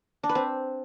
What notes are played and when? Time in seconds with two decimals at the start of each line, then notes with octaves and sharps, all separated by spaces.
0.23 D4
0.29 B4
0.35 C4